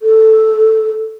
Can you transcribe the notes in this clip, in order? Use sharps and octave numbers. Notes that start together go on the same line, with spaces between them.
A4